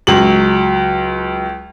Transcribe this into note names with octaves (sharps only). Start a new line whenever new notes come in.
C#2 F#3 F#7